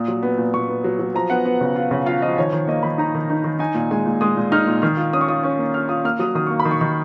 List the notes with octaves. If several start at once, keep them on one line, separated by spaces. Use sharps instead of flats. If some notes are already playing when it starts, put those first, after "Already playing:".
Already playing: A#2 D#6
F#3
B3
A#2
A#2 C#6
B3
F#3
F#3
F3 A#5
B3 F#5
B3
C#3
F4
C#3
F4 F5
F3 D#5
D#3 C#5
D#3
A#3 D#5
D#3 B5
D#4 A#5
D#3
D#4
D#3
D#4 G#5
A#2
G#3 G#5
A#2
G#3 D#6
A#2
D#4 F6
A#2
D#3 F6
F4
C#4 D#6
C#6
F4 D#6
C#4
A#3
F4 F6
F4 D#6
A#3 F6
F#3 D#6
D#3 D#6
A#3 C#6
B5
D#3
C#6
D#3